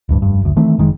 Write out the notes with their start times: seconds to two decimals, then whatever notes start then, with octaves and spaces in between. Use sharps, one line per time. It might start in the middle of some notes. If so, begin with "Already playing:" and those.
0.09 D1 D2 G2
0.22 F1 G2
0.41 F#1 D2
0.56 D#3 E3 A3 C4
0.78 F#1 D#3 G#3